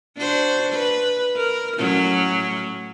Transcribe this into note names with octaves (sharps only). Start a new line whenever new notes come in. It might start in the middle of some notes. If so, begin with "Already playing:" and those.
D4 F#4 C5
B4
A#4
A2 F#3 C#4